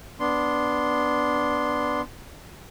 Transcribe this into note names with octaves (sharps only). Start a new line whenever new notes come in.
B3 D4 C6